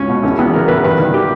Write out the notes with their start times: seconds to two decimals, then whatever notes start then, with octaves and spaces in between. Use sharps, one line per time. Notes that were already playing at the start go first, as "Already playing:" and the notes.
Already playing: C#2 C#4
0.09 B2
0.23 E2 C#4
0.38 E2 B3
0.53 C#3 A#4
0.68 E2 B4
0.84 G2 B4
0.98 D#3
1.14 G4